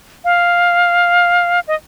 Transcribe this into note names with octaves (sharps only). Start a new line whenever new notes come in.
F5
D#5